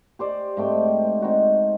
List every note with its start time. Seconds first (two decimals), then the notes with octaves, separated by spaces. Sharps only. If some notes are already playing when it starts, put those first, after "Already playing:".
0.19 G4 C5 D5
0.57 G#2 A3 C4 G5
1.22 C4 D#4 F#4